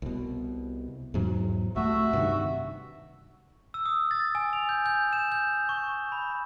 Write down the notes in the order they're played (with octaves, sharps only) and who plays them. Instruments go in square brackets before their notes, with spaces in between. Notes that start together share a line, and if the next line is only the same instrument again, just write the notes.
[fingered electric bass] C2 B2
E2 G#2 F#3
[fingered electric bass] C2 A3 [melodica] F#4 E5
[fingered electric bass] G2 C3 D#3
[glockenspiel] E6
D#6
A6
G#5
F7
G6
G6
E7
G6
C#6
B5